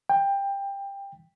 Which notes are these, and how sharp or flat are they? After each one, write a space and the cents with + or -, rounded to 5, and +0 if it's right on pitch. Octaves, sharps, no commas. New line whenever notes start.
G5 +20